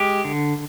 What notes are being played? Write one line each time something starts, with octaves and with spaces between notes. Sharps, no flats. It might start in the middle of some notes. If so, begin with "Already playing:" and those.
Already playing: G#3 G4
D3